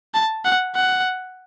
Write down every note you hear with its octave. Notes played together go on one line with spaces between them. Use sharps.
A5
F#5
F#5